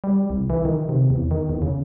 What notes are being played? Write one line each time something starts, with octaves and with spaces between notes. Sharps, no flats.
G3
C2
E3
D#3
C3
E2
D#3
E2
C#3